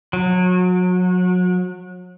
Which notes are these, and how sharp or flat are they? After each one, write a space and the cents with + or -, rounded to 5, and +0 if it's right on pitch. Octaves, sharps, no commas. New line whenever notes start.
F#3 -30